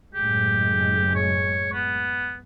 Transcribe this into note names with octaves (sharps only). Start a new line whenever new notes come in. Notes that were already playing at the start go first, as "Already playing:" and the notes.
F#1 A2 G#3 G4
C#5
B3